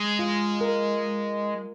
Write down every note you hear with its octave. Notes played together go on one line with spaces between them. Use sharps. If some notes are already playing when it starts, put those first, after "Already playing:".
Already playing: G#3
F4
A#4